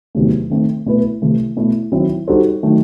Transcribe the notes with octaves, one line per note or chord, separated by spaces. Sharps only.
E2 C3 D#3 F#3 A3
D#3 A3 C4
B2 A3 E4 B4
C3 E3 A3
B2 A3 E4
D#3 F#3 C4 E4
G3 D#4 F#4 A4 C5
D#3 F#3 A3